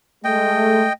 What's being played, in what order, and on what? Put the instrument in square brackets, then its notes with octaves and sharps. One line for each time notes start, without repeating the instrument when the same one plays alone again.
[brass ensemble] G#3 A3 [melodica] D#5 G5